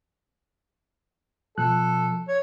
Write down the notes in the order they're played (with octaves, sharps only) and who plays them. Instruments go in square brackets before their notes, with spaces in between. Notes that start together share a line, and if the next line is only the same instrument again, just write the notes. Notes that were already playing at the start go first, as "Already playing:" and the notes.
[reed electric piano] B2 F3 F#6 [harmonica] A4
[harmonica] C#5